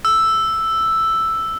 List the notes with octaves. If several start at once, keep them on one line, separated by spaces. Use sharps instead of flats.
E6